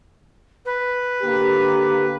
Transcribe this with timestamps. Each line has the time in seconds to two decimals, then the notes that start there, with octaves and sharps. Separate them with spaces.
0.65 B4
1.22 D3 A#3 G4